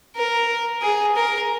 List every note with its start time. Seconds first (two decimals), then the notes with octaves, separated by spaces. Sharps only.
0.16 A#4
0.82 G#4
1.16 A#4